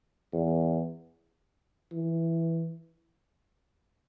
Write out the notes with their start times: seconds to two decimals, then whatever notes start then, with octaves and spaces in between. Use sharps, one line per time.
0.33 E2
1.93 E3